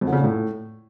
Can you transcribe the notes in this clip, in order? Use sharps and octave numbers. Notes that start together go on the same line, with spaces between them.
F2
D3
C#3
A#2
A2